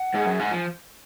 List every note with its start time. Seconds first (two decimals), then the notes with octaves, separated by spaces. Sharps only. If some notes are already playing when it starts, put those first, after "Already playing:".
Already playing: F#5
0.13 G#2 G#4
0.26 F#2
0.39 G#2 G#5
0.52 F3